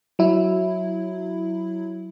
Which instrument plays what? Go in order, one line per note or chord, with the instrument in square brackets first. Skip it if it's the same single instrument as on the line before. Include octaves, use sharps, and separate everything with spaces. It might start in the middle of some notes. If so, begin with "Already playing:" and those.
[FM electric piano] F#3 E4